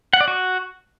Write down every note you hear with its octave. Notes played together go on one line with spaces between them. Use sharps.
F#5
D5
F#4